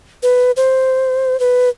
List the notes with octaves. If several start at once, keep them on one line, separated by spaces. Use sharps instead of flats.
B4
C5
B4